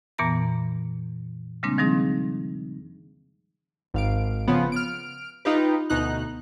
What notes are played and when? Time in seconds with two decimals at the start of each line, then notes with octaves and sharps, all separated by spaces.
0.18 F2 A#2 E3 B3 A#5 A#6
1.63 C#3 G3 G#3 A#3 C4 D4
1.78 D#3 F3 G3 C4 D#4 G#4
3.94 G#1 F5 D7
4.48 C#3 F3 B3
4.72 F6 D7
5.45 D#4 F4 G4 B4
5.90 D2 B2 D#4 F#6